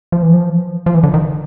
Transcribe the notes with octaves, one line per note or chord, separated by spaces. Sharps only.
F3
E3
F3
F3
E3
D3
D#3